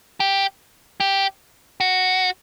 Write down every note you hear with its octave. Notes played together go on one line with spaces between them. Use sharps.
G4
G4
F#4